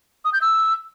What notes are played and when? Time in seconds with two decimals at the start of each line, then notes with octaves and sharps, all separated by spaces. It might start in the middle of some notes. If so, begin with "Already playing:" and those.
0.25 D#6
0.33 G6
0.42 E6